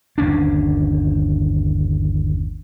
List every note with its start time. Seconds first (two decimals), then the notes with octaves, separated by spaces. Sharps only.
0.18 G1 D#2 C#4 D4